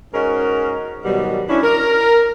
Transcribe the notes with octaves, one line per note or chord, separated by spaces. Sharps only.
G#2 C#4 F#4 G#4 A#4 D#5
G#2 B2 D#3 F#3 G3
C#4 D4 E4
A#4